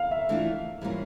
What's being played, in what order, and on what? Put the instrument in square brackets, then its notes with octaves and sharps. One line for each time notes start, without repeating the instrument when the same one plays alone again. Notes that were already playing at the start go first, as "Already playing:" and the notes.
Already playing: [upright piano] F5
E5
[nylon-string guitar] E3 A3 D4 F4
E3 G3 A#3 C#4 F4